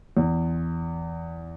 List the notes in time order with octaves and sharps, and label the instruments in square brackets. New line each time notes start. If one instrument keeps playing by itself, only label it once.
[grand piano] E2